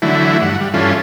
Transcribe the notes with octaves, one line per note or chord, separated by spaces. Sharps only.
D3 E3 F#3 A3 E4
G2 F#5
G3
G2 E3 C#4 F4 A4